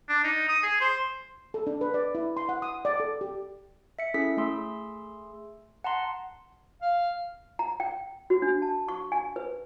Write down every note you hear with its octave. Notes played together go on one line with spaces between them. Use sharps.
D4
D#4
D#6
G#4
C5
A4
D4
B4
D5
E4
C6
F#5
D#6
D5
A4
G4
E5 C#7
C#4 E4 G#4 A4 B6
A3 G#4 C6 E6
F#5 A5 A#5 C6
F5
A#5
G5
F#4
D4
A5
C#6
G#5
B4